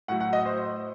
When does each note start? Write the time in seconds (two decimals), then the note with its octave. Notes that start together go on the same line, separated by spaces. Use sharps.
0.08 A2 F#3 F#5
0.20 F#5
0.33 D#5
0.45 C5